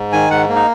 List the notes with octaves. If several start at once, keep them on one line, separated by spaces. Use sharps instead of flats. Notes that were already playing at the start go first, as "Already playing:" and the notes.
Already playing: G#2
D#3 G#5
G#2 F#5
A#3
D#4